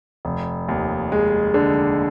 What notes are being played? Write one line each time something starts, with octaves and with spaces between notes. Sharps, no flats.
F1
D#2
G#3
D3